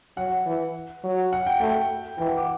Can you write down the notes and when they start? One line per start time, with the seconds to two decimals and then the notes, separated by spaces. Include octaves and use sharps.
0.17 F#3 F#5
0.46 E3
1.04 F#3
1.33 F#5
1.47 G5
1.61 A3 G5
2.18 E3 G5
2.28 F#5
2.37 D6